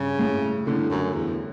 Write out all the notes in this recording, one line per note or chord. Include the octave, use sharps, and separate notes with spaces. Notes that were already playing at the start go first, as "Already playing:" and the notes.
Already playing: G2 C#3
A2
A2 D3
F#2
E2